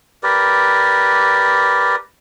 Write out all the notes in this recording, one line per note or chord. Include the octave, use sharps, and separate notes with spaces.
G4 A#4 B4 D5